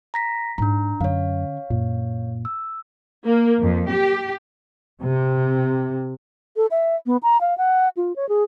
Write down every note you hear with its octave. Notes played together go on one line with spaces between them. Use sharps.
A#5 A#6 B6
G#2 D4 A#5
F#2 D3 C#4 C#5 F5
F#2 A#2
E6
A#3
F2
G4
C3
A4
E5
B3
A#5
F5
F#5
F4
C#5
G#4